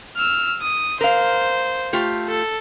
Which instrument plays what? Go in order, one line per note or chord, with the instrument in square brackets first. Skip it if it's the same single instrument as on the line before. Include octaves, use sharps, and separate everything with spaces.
[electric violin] E6 F6
D#6
[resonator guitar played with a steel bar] A#4 F5 [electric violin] C5
[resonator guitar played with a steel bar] A3 F4 G4
[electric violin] A4